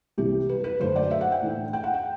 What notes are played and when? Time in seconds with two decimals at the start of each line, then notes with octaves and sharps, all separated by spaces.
0.18 C2 C3 E3 G4
0.49 B4
0.64 B4
0.80 F#2 D3 A3 D4 C5
0.96 D5
1.11 E5
1.21 F#5
1.32 G5
1.42 A2 E3 A3 D4
1.73 G5
1.84 F#5
1.94 G5